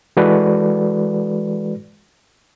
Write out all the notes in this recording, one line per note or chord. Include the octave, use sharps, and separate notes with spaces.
E3 G#3 F#4 A4 B4 D5